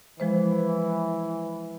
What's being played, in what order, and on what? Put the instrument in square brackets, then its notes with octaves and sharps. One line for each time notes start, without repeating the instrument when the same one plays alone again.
[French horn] E3 [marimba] F3 G#3 C5